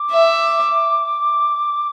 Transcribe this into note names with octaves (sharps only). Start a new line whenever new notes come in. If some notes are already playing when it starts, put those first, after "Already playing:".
Already playing: D6
E5